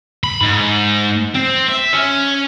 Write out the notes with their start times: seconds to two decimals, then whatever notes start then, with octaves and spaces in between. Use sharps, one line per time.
0.24 B5
0.41 G#2
1.35 C4
1.69 E5
1.93 C#4